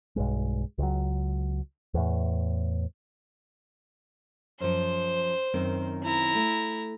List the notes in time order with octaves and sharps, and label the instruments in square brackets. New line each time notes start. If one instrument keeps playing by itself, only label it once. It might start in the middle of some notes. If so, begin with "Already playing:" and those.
[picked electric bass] B1 G2 G#3
C#2 F#3
E2 A2
[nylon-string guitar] F#2 F3 [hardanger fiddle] C5
[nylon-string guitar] F#2 D#3 C4
[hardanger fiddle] E4 A#5
[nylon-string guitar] A3